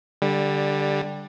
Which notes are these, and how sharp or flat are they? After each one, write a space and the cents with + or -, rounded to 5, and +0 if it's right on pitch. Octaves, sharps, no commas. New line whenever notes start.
D3 +0 G3 +10